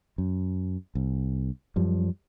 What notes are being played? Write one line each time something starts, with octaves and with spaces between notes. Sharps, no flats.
F#2
C2
F#2 F3 G3